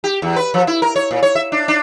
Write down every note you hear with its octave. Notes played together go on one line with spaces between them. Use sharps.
G4
E2
B4
F3
E4
A#4
C#5
A#2
C#5
E5
D4
D4